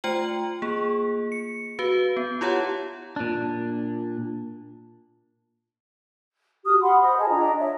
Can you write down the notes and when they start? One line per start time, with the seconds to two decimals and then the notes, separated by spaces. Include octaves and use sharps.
0.04 A3 F4 C5 G5 F#7
0.62 A#3 G#4
1.32 C#7
1.79 F#4 B4 F5
2.17 B3
2.41 E4 F4 G4 C#5 F#5 A5
3.16 A#2 D4
6.65 F#4 G4 D#6 F6
6.82 F#5 B5 C6
7.01 C5 D#5 D#6
7.18 G#4 D#5 A5
7.29 D4 F4 D#5 A#5
7.59 C#5 E5